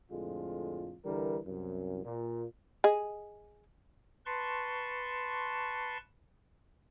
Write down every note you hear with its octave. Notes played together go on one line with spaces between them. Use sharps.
F2 A2 D3 G#3 F4
D3 E3 G3 A#4
C2 F#2
A#2
G#4 D#5
B4 A5 C6 C#6